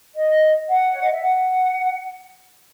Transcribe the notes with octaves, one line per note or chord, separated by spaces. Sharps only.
D#5
F#5
C#5
D#5
E5
F#5